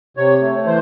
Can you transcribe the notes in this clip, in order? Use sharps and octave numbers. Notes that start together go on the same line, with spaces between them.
C3 C#5
A3
E3 C5